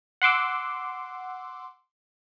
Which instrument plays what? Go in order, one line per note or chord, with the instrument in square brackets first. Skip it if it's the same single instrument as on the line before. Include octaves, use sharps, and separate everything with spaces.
[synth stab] F#5 C6 D6 E6